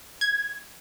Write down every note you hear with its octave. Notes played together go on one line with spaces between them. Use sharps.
G#6